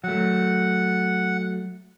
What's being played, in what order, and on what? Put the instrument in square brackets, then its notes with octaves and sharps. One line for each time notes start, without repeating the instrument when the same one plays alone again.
[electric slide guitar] F#3 A3 [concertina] F#5